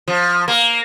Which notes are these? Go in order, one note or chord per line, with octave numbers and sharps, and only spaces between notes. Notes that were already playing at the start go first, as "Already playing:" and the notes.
F3
A#3